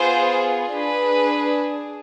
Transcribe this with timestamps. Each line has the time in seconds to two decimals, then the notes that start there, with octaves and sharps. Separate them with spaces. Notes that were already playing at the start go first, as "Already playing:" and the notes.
Already playing: B3 F4 G#4 C5
0.72 D4 G#4 B4